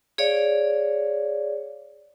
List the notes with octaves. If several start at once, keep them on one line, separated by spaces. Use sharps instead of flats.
G#4 C#5 D5 F5